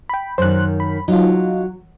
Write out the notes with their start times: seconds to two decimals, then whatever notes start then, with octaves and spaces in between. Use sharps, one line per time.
0.09 G5 B5
0.38 F#2 D#3 C5 F#6
0.80 B5
1.08 F#3 D#4 F4